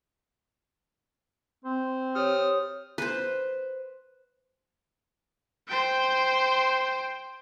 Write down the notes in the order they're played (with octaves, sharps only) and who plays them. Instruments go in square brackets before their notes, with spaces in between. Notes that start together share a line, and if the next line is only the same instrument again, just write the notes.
[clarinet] C4 [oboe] C5
[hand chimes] G4 C#5 [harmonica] D#6 F6
[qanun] B4 C5
[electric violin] C5 G5